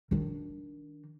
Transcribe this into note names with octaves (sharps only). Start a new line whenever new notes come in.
D#3 D4